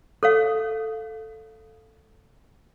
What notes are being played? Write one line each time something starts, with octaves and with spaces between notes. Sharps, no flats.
A4 C#5 F5